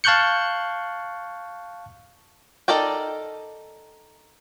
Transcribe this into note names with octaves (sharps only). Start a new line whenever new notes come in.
F5 A5 C#6 F#6 G6 C#7
D#4 A4 A#4 D5 G5